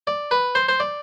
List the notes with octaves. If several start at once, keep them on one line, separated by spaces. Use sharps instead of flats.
D5
B4
C5
C5
D5